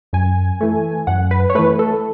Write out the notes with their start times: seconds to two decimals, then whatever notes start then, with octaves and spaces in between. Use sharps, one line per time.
0.13 F#2 G#5
0.61 E3 A3
1.07 F#2 F#5
1.31 B4
1.50 C#5
1.55 E3 A3 B4
1.79 A4